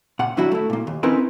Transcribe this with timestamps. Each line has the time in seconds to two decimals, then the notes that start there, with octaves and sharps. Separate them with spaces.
0.19 A#2 F#5
0.37 D#2 F#3 D4 E4 F#4 E5
0.52 A3 E4
0.70 A#2 A#3
0.87 D#2
1.03 C4 C#4 D#4 E4 A#4 B4